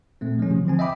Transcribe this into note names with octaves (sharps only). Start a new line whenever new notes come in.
A#2 A3 C4
F3 G#3 A3 C#4
C3 D#3 F3 F#3
D3 F3 C4 G#5
D#5 E5 G5 B5 D6